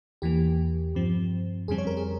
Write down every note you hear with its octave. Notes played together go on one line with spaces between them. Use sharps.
E2 E3 A#3 G4
G2 F3 C4
F2 C#3 G3 C4 G#4
C#5
A#4
G#4